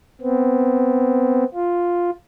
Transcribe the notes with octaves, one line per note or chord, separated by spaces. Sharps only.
B3 C4
F4